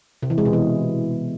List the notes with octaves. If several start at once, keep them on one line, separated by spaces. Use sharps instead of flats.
C3
E3
G#3
B2
E3